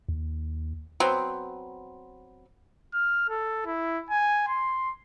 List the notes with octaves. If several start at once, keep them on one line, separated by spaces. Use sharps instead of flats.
D#2
F#3 B3 C4
F6
A4
E4
G#5
C6